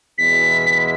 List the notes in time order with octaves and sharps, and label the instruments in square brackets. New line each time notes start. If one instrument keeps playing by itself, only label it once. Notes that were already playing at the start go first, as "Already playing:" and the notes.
[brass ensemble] E2 B2 G#3 B3 E4 [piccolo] B6